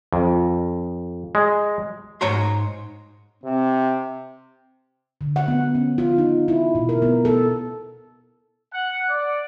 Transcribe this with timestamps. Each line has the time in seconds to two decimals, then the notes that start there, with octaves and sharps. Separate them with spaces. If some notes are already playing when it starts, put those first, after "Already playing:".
0.13 F2
1.35 G#3
2.21 G#2 C#5 A#5 C6
3.44 C3 C4
5.21 D3
5.36 F#5
5.48 B3
5.75 C#4
5.98 F4
6.18 D#4
6.48 E4
6.75 B2
6.89 A#4
7.02 B3
7.25 A4
8.73 F#5
9.10 D5